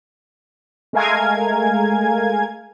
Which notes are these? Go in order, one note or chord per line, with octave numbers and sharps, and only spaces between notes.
G#3 A3 A#4 F5 G#5 G#6